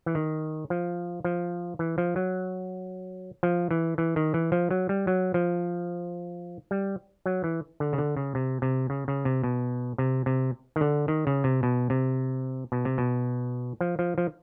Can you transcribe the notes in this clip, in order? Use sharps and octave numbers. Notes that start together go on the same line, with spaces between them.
E3
D#3
F3
F3
E3
F3
F#3
F3
E3
E3
D#3
E3
F3
F#3
G3
F#3
F3
G3
F#3
E3
D3
C#3
D3
C#3
C3
C3
C#3
C#3
C3
B2
C3
C3
D#3
D3
D#3
C#3
C3
B2
C3
B2
C3
B2
F3
F3
F3